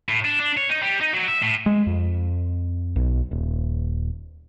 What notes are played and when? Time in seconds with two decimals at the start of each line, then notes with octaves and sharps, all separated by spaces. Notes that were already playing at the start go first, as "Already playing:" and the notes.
0.09 A2
0.25 D4
0.40 D4
0.57 C#5
0.69 D#4
0.83 G3
1.01 D#4
1.14 F#3
1.28 E5
1.43 A2
1.66 G#3
1.87 F2
2.96 B1
3.31 D#1